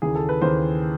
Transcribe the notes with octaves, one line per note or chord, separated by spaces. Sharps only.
D#2 C#3 E3 G#4
A4
B4
D#2 C#3 E3 C5